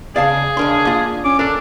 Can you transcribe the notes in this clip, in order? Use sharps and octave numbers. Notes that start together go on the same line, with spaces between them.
C#3 G#4 D5 F5 A5
C#2 D4 A#4 C6
A#3 F4
C#4 D6
D4 A4 A#4